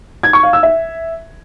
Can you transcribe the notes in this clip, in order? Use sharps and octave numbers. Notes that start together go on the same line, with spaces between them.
G#6
C#6
F5
E6
E5